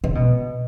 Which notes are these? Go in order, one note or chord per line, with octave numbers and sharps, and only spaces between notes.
C#3 B4 D#5
B2